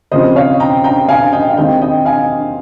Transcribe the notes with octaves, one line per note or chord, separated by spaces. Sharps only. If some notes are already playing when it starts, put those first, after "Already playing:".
D#2 C#3 F3 C4 C5 D#5
C#5 F5
G5 A#5
G5 A#5
F5 G#5
D#5 G5
F5
D#2 D#3 G#3 C4 D#5 G5
D#5 G5
F5 G#5